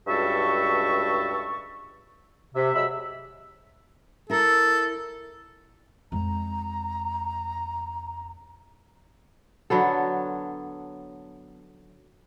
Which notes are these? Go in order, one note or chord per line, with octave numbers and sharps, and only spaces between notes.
C#2 G2 F#4 A4 E5 C#6
C3 E5
F#3 G#3 E5 B5 E6
E4 A4 A#4
F2 G#3 A#5
D3 F#3 B3 A4